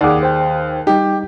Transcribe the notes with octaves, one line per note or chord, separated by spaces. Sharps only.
D#2 G#4 D5 F#5 D6
C5 G5
G3 D#4 G4